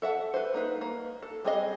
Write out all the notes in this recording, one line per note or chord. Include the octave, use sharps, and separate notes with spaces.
A4 E5 F#5 A5
B4 C5
A#3 D#4 B4
A#3
A4
G3 C4 G#4 C#5 D#5